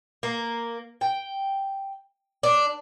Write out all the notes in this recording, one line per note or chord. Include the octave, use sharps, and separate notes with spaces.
A#3
G5
D4